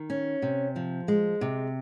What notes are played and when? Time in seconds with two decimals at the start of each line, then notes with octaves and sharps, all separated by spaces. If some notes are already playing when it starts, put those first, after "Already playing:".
Already playing: D#3
0.10 C#4
0.42 C3
0.76 F3
1.08 G#3
1.41 C3